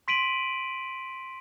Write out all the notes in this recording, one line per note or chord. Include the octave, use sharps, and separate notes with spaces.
C6 B6 D7 D#7 F#7